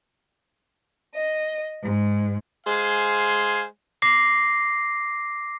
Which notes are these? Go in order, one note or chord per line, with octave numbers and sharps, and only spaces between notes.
D#5
G#2
G#3 C5 F5 G#5
D6 A#6 C7